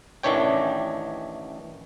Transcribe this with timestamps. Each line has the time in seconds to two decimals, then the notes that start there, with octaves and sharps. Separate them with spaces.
0.23 A1 D#3 E3 D4 C#5 G5